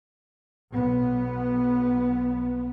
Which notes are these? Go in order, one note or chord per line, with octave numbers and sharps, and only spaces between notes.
B1 B3